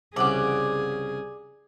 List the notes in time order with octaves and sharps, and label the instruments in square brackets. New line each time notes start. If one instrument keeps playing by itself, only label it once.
[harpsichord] C2 C#3 [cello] G#4 [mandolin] D5 F#5 D6